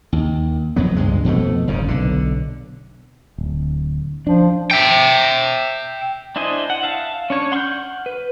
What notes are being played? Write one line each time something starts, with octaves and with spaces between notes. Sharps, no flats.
D#2
F2 F#3 B3
C#2 G2 G#3
F2 B2 A3
F#1 G#2 C#3
B1 D3
D1
F3 D4
E5 G5
D4 E4 C5 D#5 G#5
F#5
E5 F5 A5
C#4 D4 C#5
F#5 C6 C#6 F6 G6
B4